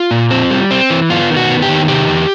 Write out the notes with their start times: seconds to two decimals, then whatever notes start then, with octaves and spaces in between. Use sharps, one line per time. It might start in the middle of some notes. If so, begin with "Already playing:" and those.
Already playing: F4
0.11 A#2
0.31 C4
0.50 G3
0.71 C4
0.90 E3
1.10 B3 F4
1.30 D#3
1.37 F#4
1.49 B3
1.62 G4
1.69 D#3
1.88 C3 G4
2.08 E2